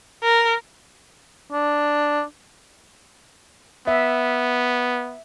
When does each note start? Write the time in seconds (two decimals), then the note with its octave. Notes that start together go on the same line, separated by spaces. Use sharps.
0.23 A#4
1.52 D4
3.87 B3 E5